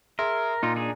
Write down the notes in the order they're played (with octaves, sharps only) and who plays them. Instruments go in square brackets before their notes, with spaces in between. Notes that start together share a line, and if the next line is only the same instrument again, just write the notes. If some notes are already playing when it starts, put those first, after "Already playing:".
[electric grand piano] G#4 E5 C6 [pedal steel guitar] A#4
[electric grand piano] A#2 [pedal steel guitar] D#4 F4
[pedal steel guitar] D4 D#4 G#4